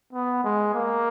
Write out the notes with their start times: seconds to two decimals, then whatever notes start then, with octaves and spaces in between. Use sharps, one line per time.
0.13 B3
0.44 G#3
0.74 A#3